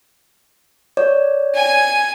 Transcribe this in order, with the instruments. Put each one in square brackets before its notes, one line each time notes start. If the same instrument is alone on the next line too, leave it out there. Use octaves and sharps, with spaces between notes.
[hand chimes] C#5 D5
[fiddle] G#5